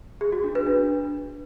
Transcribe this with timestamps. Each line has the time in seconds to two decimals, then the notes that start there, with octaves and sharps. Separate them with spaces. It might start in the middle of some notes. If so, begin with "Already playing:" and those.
0.21 G#4
0.32 F#4
0.44 D4
0.55 B4
0.67 D4